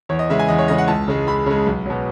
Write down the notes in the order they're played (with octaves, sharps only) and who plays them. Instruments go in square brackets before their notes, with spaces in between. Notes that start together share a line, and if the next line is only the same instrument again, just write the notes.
[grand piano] E2 C#5
D#5
C#3 G#3 E5
G#5
E2 D#5
C#5
C#3 G#3 D#5
F#5
C#2 A5
C#3 G#3
C#2 B5
C#3 G#3
B1
B2 F#3